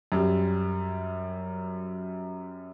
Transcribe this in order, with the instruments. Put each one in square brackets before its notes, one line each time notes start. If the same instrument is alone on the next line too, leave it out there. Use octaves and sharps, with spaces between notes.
[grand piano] F#2 G3